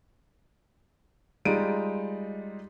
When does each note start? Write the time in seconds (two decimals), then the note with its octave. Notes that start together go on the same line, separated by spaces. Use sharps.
1.45 G3 G#3 D#4 F4 D7 D#7